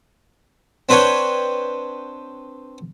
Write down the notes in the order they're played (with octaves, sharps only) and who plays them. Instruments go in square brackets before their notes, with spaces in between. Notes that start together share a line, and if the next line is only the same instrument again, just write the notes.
[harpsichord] C4 D4 B4 C#5 G5